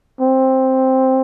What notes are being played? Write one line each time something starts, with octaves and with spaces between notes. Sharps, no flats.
C4